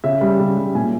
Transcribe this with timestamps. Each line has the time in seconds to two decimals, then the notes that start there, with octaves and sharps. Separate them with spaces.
0.04 C#3 E5
0.21 G3
0.39 C#3
0.57 G3
0.75 A#2 G#5